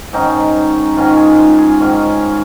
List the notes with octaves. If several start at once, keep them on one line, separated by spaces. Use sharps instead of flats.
G#2 D#3 C#4 D#4
G#2 D#3 C#4 F4
G#4
F4
G#4
G#2 D#3 C#4